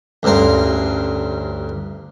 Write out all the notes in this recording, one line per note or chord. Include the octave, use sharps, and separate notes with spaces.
A1 D2 G2 A#4 C6